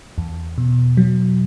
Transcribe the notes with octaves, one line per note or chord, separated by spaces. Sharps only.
E2
B2
F#3